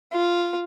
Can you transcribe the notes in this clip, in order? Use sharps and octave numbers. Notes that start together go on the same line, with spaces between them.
F4